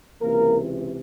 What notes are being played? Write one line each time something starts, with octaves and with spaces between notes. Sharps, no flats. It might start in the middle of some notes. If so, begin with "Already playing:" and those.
C#2 C3 E3 A#3 A#4